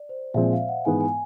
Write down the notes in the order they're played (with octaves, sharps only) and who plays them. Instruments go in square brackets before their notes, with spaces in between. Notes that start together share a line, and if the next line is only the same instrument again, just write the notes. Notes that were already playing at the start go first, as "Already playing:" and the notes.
Already playing: [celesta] D5
C5
[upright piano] A#2 F3 G#3 C4 [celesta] E5
[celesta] F5
F#5
[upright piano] G#2 E3 G#3 B3 [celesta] G#5
[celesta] G#5